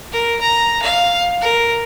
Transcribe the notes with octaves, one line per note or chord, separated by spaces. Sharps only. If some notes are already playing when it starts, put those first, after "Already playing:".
A#4
A#5
F5
A#4